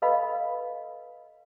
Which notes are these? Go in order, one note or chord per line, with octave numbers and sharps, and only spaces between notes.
A4 B4 D#5 F5 B5